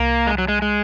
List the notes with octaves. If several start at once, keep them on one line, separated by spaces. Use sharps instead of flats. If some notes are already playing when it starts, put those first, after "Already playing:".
Already playing: C2 A#3
G#3
F#3
G#3
G#3